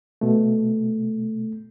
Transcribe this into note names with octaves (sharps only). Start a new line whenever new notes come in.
B2 A3